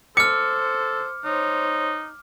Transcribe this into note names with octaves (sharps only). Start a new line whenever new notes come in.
A4 C5 D6 F6 C#7
D#4 C5 C#5